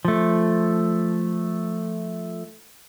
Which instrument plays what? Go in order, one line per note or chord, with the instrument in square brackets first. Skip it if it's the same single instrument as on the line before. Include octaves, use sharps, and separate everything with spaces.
[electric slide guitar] F3 A3